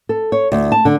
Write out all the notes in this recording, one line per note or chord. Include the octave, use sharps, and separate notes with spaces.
A4
C#5
D2
A5
D3